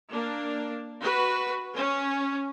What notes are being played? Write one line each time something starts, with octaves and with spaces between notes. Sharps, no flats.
A#3 D4
F#4 B4
C#4